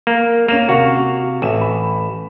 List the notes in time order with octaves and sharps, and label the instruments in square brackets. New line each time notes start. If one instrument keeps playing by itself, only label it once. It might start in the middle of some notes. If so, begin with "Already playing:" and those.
[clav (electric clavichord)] A#3
[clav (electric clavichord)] A#3 [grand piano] C#4 E7 F7
[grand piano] C3 F5 C#6 [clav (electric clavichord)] F#4
[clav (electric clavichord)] A1 [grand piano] E5 E7
[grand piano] B5